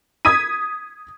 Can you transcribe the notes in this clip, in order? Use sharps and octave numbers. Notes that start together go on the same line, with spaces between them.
D#6 G#6 B6 D#7